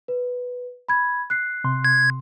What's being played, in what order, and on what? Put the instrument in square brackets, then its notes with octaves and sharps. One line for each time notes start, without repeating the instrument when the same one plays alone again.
[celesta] B4
B5 G#6
F#6 C7
[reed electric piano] C3 C6
[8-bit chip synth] G#6